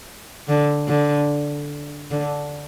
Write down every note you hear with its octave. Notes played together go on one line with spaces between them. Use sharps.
D3
D3
D3